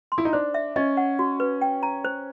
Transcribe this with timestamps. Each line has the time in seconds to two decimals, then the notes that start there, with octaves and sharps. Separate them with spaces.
0.12 C6
0.18 E4
0.25 D#4
0.33 D4 C5
0.54 E5
0.76 C#4 D#5
0.97 F#5
1.19 F#4
1.40 B4
1.62 G5
1.83 A#5
2.04 C5